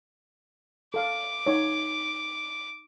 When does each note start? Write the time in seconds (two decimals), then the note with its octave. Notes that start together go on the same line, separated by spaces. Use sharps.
0.94 A4 F5 D6
1.46 D#4 C#5